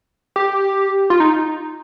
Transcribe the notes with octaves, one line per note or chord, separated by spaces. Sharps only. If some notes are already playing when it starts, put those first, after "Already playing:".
G4
F4
D#4